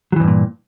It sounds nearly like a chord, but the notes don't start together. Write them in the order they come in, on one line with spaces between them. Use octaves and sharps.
F#3 E3 E2 G2 A#2